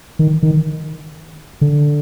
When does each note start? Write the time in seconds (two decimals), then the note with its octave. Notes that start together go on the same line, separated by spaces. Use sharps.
0.19 D#3
0.43 D#3
1.61 D3